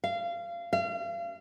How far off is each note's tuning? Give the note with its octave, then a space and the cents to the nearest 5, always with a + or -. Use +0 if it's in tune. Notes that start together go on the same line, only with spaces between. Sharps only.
F5 -25
F5 -35